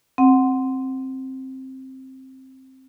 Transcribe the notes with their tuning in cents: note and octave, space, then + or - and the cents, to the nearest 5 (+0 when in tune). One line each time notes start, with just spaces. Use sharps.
C4 +10 F#5 +0